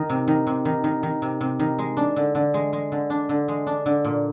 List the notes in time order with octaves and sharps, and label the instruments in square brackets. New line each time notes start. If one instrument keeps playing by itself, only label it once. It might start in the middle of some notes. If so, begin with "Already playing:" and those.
Already playing: [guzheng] D#3
C3
D#3
C3
D#3
D#3
D#3
C3
C3
D#3
G#3
D4
D3
D3
G#3
G#3
D3
D4
D3
G#3
D4
D3
A#2